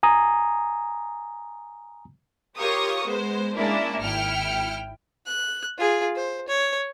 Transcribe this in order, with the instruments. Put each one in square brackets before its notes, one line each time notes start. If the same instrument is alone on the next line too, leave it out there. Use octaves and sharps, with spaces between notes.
[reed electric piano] G#5 A#5 D#6
[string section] F4 G4 A#4 C#5 C#6 D#6
G#3 B3 C5
G#3 A#3 C#4 D4 E4
G#1 E4 G5 F6 C#7
[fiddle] F#6
F4 G#4
C5
C#5